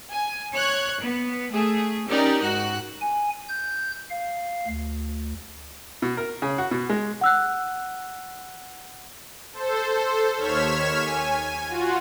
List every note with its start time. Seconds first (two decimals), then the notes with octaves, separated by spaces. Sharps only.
0.11 G#5
0.54 C#5 F#6 G#6
1.02 B3
1.53 A3 G#4
2.09 C#4 D#4 G4 A#4 D5
2.43 G#2 F#4 F#6
3.01 G#5
3.49 G6
4.10 F5
4.68 D2
6.02 B2
6.17 A#4
6.42 C#3
6.58 F#4
6.71 B2
6.90 G#3
7.21 F#5 E6 F#6
9.53 A4 C5
10.37 D#2 C#5 F6 G#6 B6 E7
11.00 G#5
11.68 F4 F#4